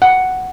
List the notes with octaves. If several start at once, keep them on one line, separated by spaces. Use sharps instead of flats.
F#5